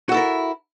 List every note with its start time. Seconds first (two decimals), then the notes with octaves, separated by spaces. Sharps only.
0.09 F#4
0.12 A4
0.14 E4
0.17 A#4